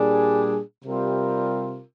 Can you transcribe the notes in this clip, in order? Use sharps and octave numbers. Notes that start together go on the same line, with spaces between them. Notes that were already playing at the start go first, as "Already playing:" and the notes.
Already playing: A#2 G3 D4 G#4
C3 G3 C4 F4 A#4